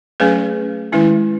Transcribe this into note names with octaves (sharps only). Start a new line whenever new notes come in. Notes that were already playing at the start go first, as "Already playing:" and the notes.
F#3 A3 C#4 G#4 B4
D#3 G#3 C#4 E4